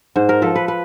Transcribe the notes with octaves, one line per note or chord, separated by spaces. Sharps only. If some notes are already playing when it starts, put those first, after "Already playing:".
G#2 C5
A#4
F3 A4
B4
B4